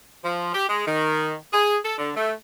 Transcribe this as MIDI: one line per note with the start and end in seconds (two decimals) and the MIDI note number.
0.24 0.53 53
0.54 0.67 67
0.69 0.84 56
0.87 1.34 51
1.53 1.78 68
1.83 1.98 69
1.98 2.11 50
2.16 2.32 57